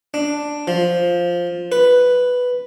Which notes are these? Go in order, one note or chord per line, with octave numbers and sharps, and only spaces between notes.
D4
F3
B4